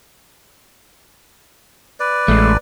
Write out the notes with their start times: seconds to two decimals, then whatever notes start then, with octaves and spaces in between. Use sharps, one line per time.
2.00 B4 D5
2.28 A1 G#3 A3